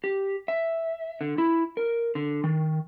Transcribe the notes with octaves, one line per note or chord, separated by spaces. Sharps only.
G4
E5
D3
E4
A#4
D3
D#3